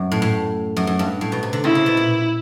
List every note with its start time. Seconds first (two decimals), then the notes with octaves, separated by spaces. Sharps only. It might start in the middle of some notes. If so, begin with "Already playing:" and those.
Already playing: F#2
0.12 A2
0.22 A2
0.77 F#2
0.87 F#2
0.99 G2
1.21 A2
1.32 B2
1.43 C3
1.53 D3
1.64 C#3 E4
1.75 C3
1.86 B2
1.97 A#2